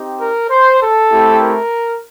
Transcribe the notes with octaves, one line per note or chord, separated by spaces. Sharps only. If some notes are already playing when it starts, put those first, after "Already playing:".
Already playing: C4 D#4 G4
A#4
C5
A4
A3 C4 E4 G4
A#4